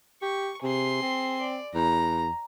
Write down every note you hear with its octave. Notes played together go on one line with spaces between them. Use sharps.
G4 C#6
C3 G#4 C6
C4
D5
E2 A#5